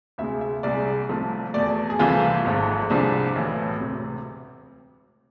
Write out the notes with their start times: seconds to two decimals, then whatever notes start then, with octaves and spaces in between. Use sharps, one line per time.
0.18 D2 C3 G#3 E5
0.41 E5
0.63 C2 C3 G#3 D5
1.09 C2 C3 F3 A3
1.54 E2 B2 A3 D5
1.90 G#4
1.99 C2 C3 E3 A3 F4
2.45 G#1 G#2 F3 A3
2.90 C2 C3 F3 G#3 D4
3.36 B1 A2 E3 A3
3.80 E1 D2 C3